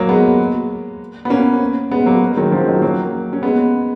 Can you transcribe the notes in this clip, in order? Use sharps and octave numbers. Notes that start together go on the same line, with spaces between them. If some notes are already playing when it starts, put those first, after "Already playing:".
Already playing: F#3 A#3
G#3 B3
B3
A#3 C#4
G#3 B3
F#3 A#3
G#3
D#3 F#3
C#3 F3
D#3 F#3
F#3 A#3
C#4
G#3 B3